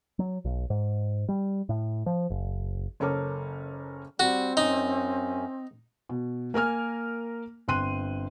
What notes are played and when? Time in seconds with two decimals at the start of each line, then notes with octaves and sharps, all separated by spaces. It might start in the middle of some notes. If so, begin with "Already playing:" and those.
0.19 F#3
0.45 B1
0.70 G#2
1.29 G3
1.69 A2
2.06 F3
2.30 F#1
3.00 F#1 C#4 A4 A#4 D6
4.20 G3 C4 F#4
4.57 F#2 C#4 D#4
6.09 B2
6.54 A#3 A#4 G#5 F6
7.68 G1 C4 C6 F#6 D#7